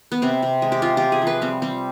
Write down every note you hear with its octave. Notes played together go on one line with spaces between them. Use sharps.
B3
C3 C4
C3
G#3
G4
C3 F4
C3 G4
G#4
F3
B4
G3 C4
G3 C4